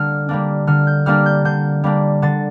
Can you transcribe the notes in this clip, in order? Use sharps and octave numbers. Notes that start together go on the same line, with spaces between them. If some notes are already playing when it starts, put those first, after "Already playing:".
Already playing: D3 G3 A#3 D4 F6
G3 A#3 D4
D3 F6
G6
G3 A#3 D4 F6
G6
D3 G6
G3 A#3 D4
D3 A6